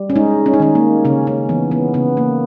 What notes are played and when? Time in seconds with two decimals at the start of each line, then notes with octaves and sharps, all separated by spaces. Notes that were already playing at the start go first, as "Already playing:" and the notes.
Already playing: G3
0.10 C#4
0.15 G#3 D#4
0.46 C#4
0.54 D#4
0.60 D#3 C#4
0.75 A#3
1.05 C#3 C#4
1.27 C#4
1.49 E3 B3
1.71 B3
1.94 C#3 B3
2.17 A#3